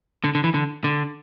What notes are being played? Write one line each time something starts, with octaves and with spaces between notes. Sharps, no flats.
D3
D3
E3
D3
D3